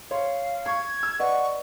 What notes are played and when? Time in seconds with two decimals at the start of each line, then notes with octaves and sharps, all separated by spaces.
0.11 C#5 F5 C6
0.66 C#6 G#6
1.03 E6
1.20 B4 D5 D#5 F#5 C#6